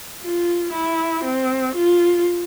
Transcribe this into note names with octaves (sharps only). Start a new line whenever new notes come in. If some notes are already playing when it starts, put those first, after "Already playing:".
F4
E4
C4
F4